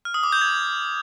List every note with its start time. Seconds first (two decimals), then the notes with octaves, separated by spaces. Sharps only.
0.05 F6
0.14 D#6
0.23 D6
0.32 G6
0.41 G#6